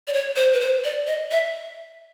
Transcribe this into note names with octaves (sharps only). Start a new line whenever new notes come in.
D5
C#5
C5
B4
C5
D5
D#5
E5